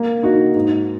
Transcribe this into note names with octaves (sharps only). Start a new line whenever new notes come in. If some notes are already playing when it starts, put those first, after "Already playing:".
Already playing: A#3
D#4 F#4
G#2